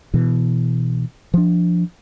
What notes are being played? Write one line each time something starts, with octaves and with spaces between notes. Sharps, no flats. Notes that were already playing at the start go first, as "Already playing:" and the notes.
B2 E3
F3 D4